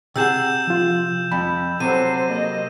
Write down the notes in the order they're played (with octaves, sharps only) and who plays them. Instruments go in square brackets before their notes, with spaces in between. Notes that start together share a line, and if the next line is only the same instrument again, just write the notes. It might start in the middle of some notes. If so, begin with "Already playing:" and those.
[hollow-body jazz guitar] C3 G#4 F#5 [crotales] E6 G6 E7
[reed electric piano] F3 F4
[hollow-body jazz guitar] F2 [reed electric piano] B5
[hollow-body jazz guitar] C3 F#3 [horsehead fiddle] A4 C5 [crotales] D#7
[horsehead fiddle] A#3 D#5